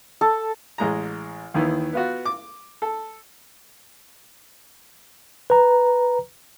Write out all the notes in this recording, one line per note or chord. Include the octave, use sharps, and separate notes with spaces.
A4
A1 G#3 A#5
D#2 D#3 E3
B3 F4 F#4
D6
A4
B4 A#5